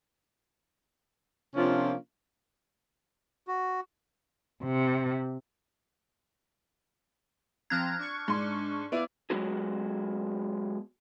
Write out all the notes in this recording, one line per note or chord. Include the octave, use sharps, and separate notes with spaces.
C3 F3 A#3 C#4 D4 F4
F#4
C3
F3 C4 A#5 F6 F#6 G#6
D4 C#6
G#2 C6
B3 E4 D5 F5
F#3 G#3 B3 F#4 G#4